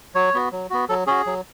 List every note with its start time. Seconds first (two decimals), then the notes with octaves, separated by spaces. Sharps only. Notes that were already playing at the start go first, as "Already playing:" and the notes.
0.15 F#3 C#5
0.34 B3 F#4
0.52 F#3
0.70 B3 F#4
0.89 F#3 A4
1.07 C#4 F#4 G#4
1.26 F#3